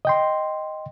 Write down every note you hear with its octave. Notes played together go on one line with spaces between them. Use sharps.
D#5 G5 C6